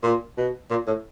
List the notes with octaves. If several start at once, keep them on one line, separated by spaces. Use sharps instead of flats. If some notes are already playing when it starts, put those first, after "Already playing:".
A#2
B2
A#2
A2